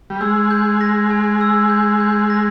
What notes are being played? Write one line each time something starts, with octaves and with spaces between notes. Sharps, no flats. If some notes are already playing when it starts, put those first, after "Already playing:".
G3
G#3 E6
G6
A#6
G#5
E6
G6
G6
A#6